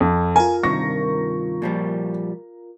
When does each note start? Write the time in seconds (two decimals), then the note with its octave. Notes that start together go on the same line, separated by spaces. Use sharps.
0.01 F2
0.36 F4 A#4 G#5
0.63 G2 C3 D#3 C#6 A#6
1.62 A#2 F3 G3